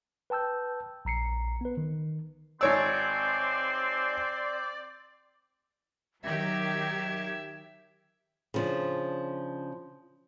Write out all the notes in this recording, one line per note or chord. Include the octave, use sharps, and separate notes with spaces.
B4 G5 A5 E6 G6
A#1 A#5 C7 C#7
B3 B4
D#3
G#1 C4 C#5 D5 C6 E6
D#3 F#3 G4 E5 G#6
C#3 F3 D4